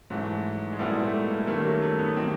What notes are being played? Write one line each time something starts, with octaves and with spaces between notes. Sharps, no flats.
G#2 E3 F#3 A3
G#3
A#2 F#3 G3 B3 E4 A4
G#3
A3
A3
A#3
F#2 D#3 G3 A3 A#3
F#3
A3
B3
D#3 F#3 A#3 C4 D#4 G4